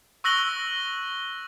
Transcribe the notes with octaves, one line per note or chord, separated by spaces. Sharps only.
C#6 E6 F#6 A#6 F#7 G7